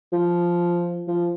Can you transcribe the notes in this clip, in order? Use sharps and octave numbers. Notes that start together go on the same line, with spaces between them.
F3
F3